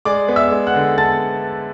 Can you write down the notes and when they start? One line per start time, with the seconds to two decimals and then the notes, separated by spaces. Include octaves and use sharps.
0.05 G#3 D5 D6
0.28 B3
0.36 E5 E6
0.51 G#3
0.67 F#5 F#6
0.75 D3
0.98 B3 A5 A6